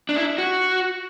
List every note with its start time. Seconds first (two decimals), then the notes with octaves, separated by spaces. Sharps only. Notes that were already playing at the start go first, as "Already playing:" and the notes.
0.09 D4
0.16 E4
0.38 F#4